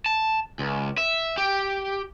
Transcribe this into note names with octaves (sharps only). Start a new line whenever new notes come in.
A5
C#2
E5
G4